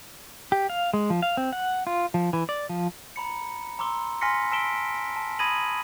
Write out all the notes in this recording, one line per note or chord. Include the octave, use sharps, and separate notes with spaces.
G4
F5
G#3
F3
F5
C4
F#5
F4
F3
E3
D5
F3
A#5 B5 C#7
A#5 C6 D6 E6 G7
G#5 C6 F6 A#6 B6 C#7
A5 E6 B6 D7 E7 G7
A5
B5 D#6 G#6 A#6 D#7 F#7